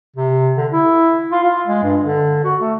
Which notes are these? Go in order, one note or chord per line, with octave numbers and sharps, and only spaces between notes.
C3
D3
E4
F4
F4
G#3
G2
D3
F#4
A3